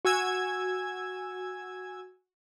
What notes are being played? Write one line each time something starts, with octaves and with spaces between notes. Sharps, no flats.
F#4 G#5 E6 G#6